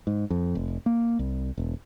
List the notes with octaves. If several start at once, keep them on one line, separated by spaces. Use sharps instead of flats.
G#2
F2
F1
A#3
C2
E1